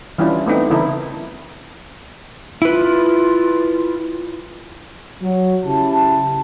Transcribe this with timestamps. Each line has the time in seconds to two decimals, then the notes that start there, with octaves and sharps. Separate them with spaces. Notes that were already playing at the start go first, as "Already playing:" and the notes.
0.18 E3 G3 C#4 D4 E4 F4
0.47 A3 B3 C4 D#4
0.70 C#3 E3 E4 A4 A#4
2.62 E4 F4 B4
5.22 F#3
5.65 C#3 E4 G4 A5